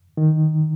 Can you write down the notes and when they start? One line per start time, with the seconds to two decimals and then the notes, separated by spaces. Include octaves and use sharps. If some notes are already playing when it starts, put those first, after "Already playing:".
0.17 D#3